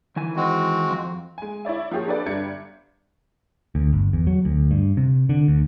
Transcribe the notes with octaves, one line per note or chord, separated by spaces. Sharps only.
D#3 E3 G#5
G#3 C4 F#4
F2
G#3 G#5
E4 C#5 D5 E5
F3 A#3 G4 G#4 C#5
D4 G4 A4 B4 D5
G1 G3 D4 E5 G#6 C#7
D2
G1
E2
F#3
D2
G2
C3
D3
D2